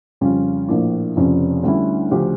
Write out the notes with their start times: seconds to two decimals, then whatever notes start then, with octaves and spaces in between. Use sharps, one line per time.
0.21 F2 C#3 G3 C#4 F4
0.68 A#1 A2 F3 A#3 D4
1.16 F1 F2 C#3 F3 C#4
1.63 D2 D3 G3 C#4 E4
2.11 D2 C#3 F3 C#4 G4